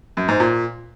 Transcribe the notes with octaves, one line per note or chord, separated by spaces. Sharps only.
F#2
G#2
A#2